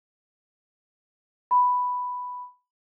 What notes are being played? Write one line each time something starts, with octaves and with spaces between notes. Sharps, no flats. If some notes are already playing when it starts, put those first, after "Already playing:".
B5